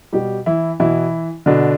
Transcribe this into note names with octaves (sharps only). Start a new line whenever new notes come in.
B2 G3 G4
E3 E4
B2 E3 E4
B2 D3 D4